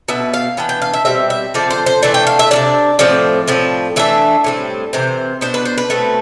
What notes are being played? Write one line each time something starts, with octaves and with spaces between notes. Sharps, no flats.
B2 B3 D4 E5
F5
E3 B3 D4 G5
G5
F5
E5
B2 G3 C4 E5
E5
D3 F3 C4 D5
C5
C5
E3 A3 D4 D5
G5
F5
E5
C3 G3 D4 D5
A2 F3 C4 D5
A2 F3 C4
E3 A3 D4 E5
A2 G3 C4
C3 E3 C5
B2 B3 D4 C5
B4
C5
B4
B2 A3 C4